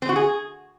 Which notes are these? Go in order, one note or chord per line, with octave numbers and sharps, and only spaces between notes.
C4
F#4
G#4